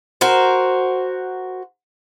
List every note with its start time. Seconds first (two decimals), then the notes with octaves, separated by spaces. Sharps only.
0.21 F#4 A#4 C5